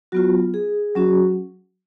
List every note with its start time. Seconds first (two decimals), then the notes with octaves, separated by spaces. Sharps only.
0.12 F#3 B3 F4 F#4
0.54 G#4
0.95 F#3 C#4 F#4